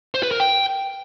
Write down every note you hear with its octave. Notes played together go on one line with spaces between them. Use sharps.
C5
B4
A#4
G5